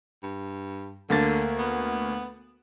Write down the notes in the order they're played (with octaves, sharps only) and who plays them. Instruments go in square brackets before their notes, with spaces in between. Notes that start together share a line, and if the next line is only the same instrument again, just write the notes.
[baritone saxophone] G2
[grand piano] D2 A#3 A6 [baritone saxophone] D3
[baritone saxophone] B3